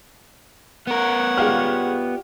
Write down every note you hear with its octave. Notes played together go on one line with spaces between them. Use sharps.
B3 A#4 C#5 F#5
G#3 F4 G4 D5 F5 F6